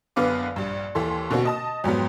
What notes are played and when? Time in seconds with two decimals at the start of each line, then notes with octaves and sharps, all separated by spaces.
0.16 F#1 D3 B3 B4 F5 D6
0.56 A#1 G2
0.95 D#2 E3 A4 C6
1.30 B2 D3 A#3 C4 F#4
1.45 D#5 A5 D#6
1.84 F2 G#2 F#3 B3